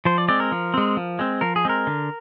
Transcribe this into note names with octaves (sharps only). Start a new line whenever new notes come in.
F3 C5
D5
G#3 C4 D5
A#4
F3
G#3 C4
F3
G#3 C4
F3 A#4
G#4
G#3 C4 A#4
D3